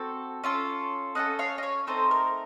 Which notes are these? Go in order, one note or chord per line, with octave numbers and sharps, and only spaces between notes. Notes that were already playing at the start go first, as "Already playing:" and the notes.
Already playing: C4 F#4 A4
C#4 F4 A4
C#4 F4 A4 D#5 F#5
C#5 F5
D#5
C#5 F5
A3 C4 D#4 A4 C5
A#4